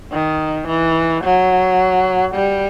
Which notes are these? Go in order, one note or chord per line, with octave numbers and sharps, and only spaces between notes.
D#3
E3
F#3
G3